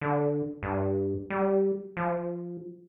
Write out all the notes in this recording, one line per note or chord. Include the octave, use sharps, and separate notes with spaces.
D3
G2
G3
F3